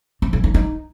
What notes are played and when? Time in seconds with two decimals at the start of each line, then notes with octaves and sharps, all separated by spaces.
0.22 C4
0.33 E3
0.44 D#4
0.54 D#4